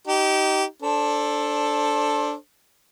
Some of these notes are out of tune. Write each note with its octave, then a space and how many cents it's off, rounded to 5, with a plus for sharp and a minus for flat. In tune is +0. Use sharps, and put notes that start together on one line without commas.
D#4 +0 G4 -25
D4 +0 A4 +0 C5 +25